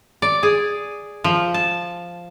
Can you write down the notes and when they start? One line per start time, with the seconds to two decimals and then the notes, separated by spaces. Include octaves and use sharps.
0.22 D5
0.43 G#4
1.24 F3
1.54 A5